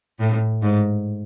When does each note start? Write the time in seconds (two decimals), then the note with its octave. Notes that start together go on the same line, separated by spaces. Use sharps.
0.19 A2
0.62 G#2